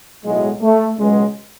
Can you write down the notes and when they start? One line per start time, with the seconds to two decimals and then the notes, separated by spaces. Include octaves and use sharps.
0.24 B1 A2 F#3 G#3
0.61 A3
0.97 C#2 B2 F#3 G#3